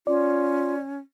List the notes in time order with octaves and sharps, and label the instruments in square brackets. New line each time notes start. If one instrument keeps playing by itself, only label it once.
[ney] C#4 [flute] F4 [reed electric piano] D5